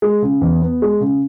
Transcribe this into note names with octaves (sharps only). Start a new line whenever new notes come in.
G#3
C#3
E2
B3
G#3
C#3